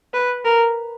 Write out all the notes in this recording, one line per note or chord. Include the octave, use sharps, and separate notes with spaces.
B4
A#4